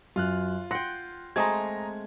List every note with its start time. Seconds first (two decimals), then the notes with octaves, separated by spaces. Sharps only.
0.16 F#2 F4 F6 F#6
0.71 F#5 G5 C6 A#6
1.36 G#3 A3 C4 A#5 D#6 G#6